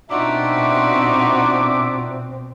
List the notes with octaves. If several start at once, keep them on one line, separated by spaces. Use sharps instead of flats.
B2 C4 D4 D#4 F4 F#4 E5 D6